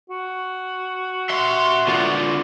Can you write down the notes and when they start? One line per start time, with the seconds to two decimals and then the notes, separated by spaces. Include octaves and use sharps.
0.10 F#4
1.30 E5 C6
1.87 D3 F4